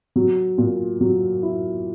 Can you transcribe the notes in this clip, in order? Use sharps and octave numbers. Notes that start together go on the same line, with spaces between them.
F#3
A#2
F#3
E4